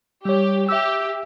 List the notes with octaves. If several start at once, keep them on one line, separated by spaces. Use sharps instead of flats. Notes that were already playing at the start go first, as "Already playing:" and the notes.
G3 G4 C#5
G4 E5 E6